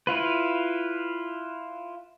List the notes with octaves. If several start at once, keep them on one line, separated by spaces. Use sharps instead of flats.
E4 F4 B4